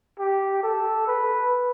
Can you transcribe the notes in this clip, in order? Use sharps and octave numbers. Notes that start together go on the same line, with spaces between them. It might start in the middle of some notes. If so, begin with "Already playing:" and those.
G4
A4
B4